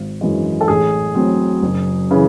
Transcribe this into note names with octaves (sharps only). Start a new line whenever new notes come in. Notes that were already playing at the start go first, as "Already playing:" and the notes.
Already playing: G#1
F#2 E3 G#3
A4
A1 G#4
A2 F#3 C4
F#1
C#3 E3